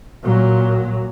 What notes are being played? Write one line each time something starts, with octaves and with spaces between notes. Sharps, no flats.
A#2 F#3